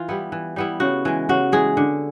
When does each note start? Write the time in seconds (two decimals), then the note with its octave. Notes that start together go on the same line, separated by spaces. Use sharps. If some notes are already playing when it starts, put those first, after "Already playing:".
Already playing: E3 F4
0.08 G3 B3 E4
0.32 E3
0.56 G3 B3 E4
0.80 C#3 F#4
1.05 E3 G#3
1.29 C#3 F#4
1.52 E3 G#3 G#4
1.77 D3